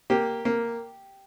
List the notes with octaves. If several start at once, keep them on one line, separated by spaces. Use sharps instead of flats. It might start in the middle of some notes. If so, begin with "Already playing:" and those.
A#3 G4
A#3